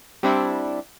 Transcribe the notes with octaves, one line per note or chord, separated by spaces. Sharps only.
G3 C4 D4 E4